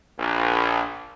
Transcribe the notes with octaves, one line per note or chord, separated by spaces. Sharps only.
A#1